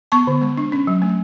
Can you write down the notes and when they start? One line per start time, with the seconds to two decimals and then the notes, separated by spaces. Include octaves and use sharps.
0.12 B3 A5 C#6
0.27 D3
0.41 G#3
0.57 D4
0.72 C#4
0.87 F#3
1.02 A3